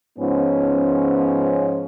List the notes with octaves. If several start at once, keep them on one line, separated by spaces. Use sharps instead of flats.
G#2 F3 B3 C#4